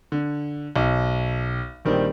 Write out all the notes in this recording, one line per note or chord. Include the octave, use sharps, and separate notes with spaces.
D3
B1
A#1 D#3 G3 C4